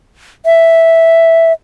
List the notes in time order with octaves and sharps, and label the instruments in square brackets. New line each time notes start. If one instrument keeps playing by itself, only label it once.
[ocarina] E5